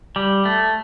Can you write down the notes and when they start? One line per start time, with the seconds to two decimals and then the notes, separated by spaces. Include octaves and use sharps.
0.16 G3
0.45 A3